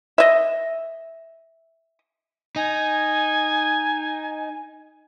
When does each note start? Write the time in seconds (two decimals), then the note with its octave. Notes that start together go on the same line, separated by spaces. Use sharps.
0.18 D#5 E5
2.56 D#4 G#5